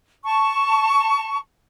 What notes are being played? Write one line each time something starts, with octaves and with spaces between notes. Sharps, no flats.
A5 C#6